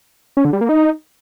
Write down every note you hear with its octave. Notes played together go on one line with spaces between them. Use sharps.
C#4
D3
G3
A#3
D#4